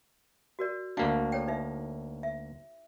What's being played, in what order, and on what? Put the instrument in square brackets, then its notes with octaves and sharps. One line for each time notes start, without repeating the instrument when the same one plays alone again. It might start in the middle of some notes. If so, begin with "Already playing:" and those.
[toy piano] F#4 A#4 D5
[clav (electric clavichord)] D2 A#3 D4 [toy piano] F#4 F5 G5
[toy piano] A4 C#5 G5
D#4 B4 E5
E5